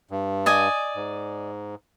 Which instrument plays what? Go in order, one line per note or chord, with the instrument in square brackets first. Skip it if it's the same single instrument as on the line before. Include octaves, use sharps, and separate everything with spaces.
[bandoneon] G2
[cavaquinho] D5 D#5 G#5
[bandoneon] G#2